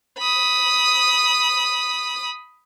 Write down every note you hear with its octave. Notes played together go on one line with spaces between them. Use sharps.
B5 D#6